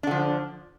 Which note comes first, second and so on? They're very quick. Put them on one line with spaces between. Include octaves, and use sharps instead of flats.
D4 D3 F3